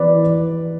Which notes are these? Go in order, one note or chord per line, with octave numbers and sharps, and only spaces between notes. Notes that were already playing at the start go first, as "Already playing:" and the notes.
Already playing: E3 B3 B4 D5